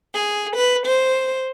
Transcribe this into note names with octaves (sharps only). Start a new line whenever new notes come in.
G#4
B4
C5